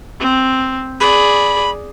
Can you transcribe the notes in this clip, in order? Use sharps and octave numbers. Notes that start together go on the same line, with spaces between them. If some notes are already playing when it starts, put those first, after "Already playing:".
C4
G#4 D5 B5